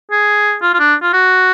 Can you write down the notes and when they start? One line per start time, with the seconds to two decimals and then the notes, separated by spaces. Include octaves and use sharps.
0.11 G#4
0.62 F4
0.74 F4
0.79 D4
1.02 F4
1.13 F#4